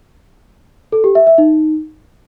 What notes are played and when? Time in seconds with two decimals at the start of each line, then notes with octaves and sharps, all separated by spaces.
0.92 A4
1.04 G4
1.15 E5
1.27 E5
1.38 D#4